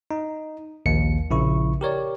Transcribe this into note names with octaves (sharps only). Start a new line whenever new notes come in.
D#4
A#1 D#2 C#7
A#1 C#3 E4 C#6
G4 A#4 C#5 D5